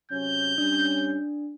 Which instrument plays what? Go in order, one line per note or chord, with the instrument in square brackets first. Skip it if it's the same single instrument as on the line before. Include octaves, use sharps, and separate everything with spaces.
[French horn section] C3 F#3 C#4 [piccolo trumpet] G6
[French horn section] G3 C#4 [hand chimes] D4